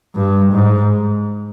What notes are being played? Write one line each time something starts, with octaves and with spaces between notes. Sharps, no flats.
G2
G#2